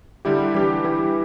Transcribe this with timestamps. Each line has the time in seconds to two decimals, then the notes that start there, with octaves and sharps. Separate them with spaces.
0.25 D3 G3 E4 G4
0.54 E3 G3 D4 G4
0.84 E3 G3 E4 G4